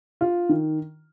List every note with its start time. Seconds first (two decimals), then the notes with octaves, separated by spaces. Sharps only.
0.21 F4
0.49 D#3